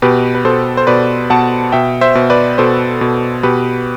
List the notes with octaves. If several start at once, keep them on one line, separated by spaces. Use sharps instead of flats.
B2 G4 B4
B4
B2 A4 C5
C5
B2 B4 D5
B2 F#5 A5
B2 E5 G5
C5 E5
B2
B4 D5
B2 A4 C5
B2
B2 G4 B4